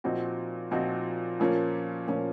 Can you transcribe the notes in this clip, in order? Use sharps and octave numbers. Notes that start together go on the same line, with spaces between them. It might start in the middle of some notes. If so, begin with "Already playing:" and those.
A#2 F3 C4 D#4 F#4
A#2 F3 C4 D#4 F#4
A#2 F3 A#3 C#4
A#2 F3 A#3 C#4